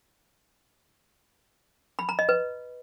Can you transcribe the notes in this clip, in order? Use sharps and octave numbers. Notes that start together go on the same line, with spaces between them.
B5
A#5
D#5
B4